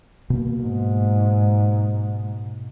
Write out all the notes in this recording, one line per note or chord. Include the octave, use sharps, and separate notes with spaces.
B2 A#3
G#2